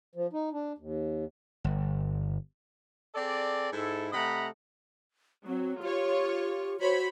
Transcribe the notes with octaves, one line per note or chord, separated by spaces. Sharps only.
F3
D#4
D4
D#2
G1
C4 G#4 A4 D5
G#2 E4 A4
C3 A3 D#5 F#5 A#5 B5
F#3 C4
F4 G4 C#5
F#4 C5 C#5 B5